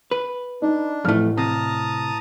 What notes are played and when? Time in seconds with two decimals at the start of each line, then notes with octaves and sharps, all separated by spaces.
0.11 B4
0.62 D4 D#4
1.05 A1 F2 A3 F6
1.38 C3 A5 A#5 D#6